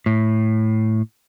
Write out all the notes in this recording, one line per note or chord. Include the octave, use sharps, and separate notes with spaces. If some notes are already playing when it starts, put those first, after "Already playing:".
A2